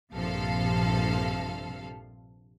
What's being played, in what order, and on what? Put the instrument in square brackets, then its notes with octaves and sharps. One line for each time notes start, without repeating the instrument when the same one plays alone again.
[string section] A#1 G2 C3 F3 A4 F5